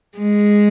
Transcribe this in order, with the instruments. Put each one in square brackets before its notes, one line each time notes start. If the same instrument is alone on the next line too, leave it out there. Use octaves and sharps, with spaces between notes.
[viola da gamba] G#3